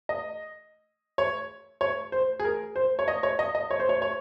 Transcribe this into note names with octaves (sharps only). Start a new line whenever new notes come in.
D#5
C#5
C#5
C5
G#4
A#4
C5
C#5
D#5
C#5
D#5
D#5
C#5
C5
C#5
C#5